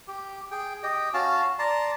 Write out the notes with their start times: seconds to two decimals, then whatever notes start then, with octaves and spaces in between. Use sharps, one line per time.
0.08 G4
0.51 G#4 G5
0.83 G4 D#5 G5
1.14 C#4 F#4 F5 A5
1.59 D5 A5 A#5 C6